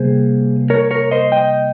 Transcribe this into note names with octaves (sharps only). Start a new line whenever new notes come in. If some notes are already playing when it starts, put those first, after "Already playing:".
Already playing: C3 G3 A#3 G#4 C5
A#4 C#5
A#4 C#5
C5 D#5
D#5 G5